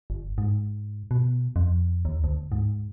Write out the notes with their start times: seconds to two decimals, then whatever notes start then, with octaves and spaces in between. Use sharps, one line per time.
0.10 G1
0.38 G#2
1.11 B2
1.56 F2
2.05 D#2
2.24 D2
2.52 G#2